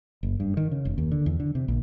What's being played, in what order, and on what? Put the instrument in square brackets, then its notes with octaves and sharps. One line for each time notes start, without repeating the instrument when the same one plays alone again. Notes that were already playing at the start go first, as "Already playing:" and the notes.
[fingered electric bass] F#1
G2
D#3
C#3
F1
D#2
D3
E2
D3
C3
A#1